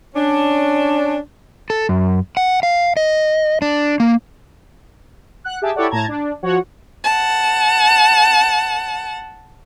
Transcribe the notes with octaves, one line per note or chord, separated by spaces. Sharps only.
C#4 D4
A4
F#2
F#5
F5
D#5
D4
A#3
F#5 F#6
G4 G#4 E5 A5
E4 G4 A4 C#5 D5 F#5
A2 A5 A#5 G#6
D4
F3 F#4 C#5 F#5
F#5 A5